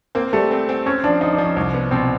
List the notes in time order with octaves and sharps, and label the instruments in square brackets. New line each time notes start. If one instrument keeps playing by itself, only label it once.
[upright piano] A#3 [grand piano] C4
[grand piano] G3 [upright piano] A3
[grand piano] C4
C4
[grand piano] C4 [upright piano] C#4
[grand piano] F3 [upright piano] D4
[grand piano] F3 [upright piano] D#4
[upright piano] D4
[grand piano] F3
[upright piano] C#4
[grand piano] C2
B3
[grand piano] B2 [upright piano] C4